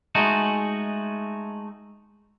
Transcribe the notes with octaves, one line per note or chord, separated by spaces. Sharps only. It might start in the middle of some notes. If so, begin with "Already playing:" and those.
G#3 A3 D#4 F#4